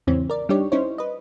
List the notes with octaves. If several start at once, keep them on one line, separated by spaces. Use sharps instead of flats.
E2 G#2 C#3 E3 C4 C#4
A#4 D5
G3 D4 D#4 G4 C#5 D5
C#4 D#4 E4 C5 C#5
B4 D#5